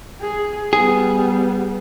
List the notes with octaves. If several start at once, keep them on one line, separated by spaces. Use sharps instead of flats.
G#4
G3 B3 G#4